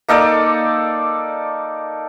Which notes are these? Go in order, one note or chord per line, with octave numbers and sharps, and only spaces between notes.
A#3 D#4 A4 D5